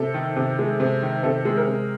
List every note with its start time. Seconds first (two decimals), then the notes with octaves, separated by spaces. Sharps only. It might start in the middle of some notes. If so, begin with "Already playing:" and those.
Already playing: C3 A4
0.14 D#3
0.36 C3
0.59 G#3
0.80 C3
1.02 D#3
1.23 C3 A4
1.45 G#3
1.57 A#4
1.67 C3